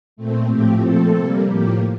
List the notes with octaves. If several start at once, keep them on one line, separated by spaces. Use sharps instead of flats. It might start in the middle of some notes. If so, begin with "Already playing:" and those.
A#2 A3 C4
A2 F3 A3 C4 G4
A#2 F3 A3 C4 A4
C3 G3 A#3
A2 F3 A#3 G4